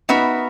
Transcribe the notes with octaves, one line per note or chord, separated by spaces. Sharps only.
B3 D#4 F#4 A#4 E5 B5